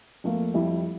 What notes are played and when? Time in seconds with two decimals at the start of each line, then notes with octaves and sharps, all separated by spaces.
0.24 F2 A3 A#3
0.54 F2 G3 E4